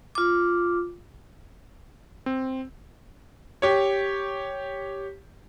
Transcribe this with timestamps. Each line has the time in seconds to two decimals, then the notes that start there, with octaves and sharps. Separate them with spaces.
0.15 F4 D6
2.26 C4
3.62 G4 C#5